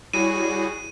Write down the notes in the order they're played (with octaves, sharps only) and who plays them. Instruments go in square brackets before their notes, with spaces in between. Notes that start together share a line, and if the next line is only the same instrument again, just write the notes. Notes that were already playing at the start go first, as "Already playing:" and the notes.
[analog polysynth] G3 F#4 G#4 [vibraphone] E4 C#5 B5 [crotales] D#7